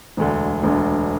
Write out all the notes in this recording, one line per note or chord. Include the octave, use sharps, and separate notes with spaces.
E1 D2 D3
E1 D2 D3